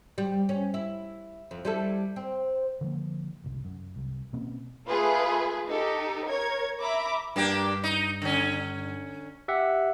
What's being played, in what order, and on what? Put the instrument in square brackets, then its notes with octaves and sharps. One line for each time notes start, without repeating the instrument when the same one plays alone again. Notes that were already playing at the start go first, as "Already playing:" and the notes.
[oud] G3
C#4
E4
F2
G3 E4 A4
C4
[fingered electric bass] D3 F3 G#3 A#3
F#1 C2
F#2
C2
B2 A#3 C4 C#4
[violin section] A3 F4 G#4 B4
D#4 G4 A4
A#4 C#5 G#6
E5 A#5 B5 D6
[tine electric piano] G2 [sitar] A#3 D4 G4
[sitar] D#4
D3 C#4
[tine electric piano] G4 E5 F#5